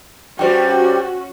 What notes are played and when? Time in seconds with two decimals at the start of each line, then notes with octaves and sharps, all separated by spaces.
0.39 G2 G3 C#4 F#4 C5 G5